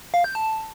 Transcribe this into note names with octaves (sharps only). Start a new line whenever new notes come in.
F5
G6
A5